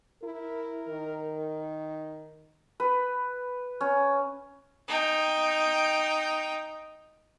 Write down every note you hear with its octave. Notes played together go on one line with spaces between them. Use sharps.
E4 A#4
D#3
B4
C#4
D#4 G5